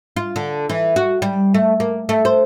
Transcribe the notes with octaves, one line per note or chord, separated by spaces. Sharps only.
F4
D3
E3
F#4
G3
A3
A#3
A3
C5